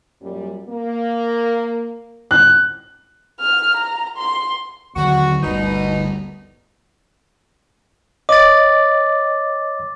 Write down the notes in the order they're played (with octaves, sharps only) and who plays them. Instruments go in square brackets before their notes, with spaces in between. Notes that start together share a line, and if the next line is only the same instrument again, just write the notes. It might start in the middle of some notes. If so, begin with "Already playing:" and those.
[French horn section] F#2 A#2 G3
A#3
[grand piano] F#6
[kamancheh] F6
A#5
C6
[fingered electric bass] D#2 D3 F#3 [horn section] F#4
[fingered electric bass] G1 D2 G3 [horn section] B2 D#4
[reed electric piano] C#5 D#5 [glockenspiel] D6 A6